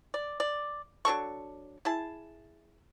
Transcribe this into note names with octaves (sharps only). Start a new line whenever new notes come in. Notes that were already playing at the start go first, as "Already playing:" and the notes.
D5
D5
F#3 D4 A4 C#6
E4 G#4 A5